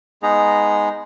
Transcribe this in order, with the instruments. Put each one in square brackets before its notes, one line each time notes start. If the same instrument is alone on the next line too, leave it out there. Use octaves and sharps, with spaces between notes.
[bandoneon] G#3 B3 D#4 G#4 A#5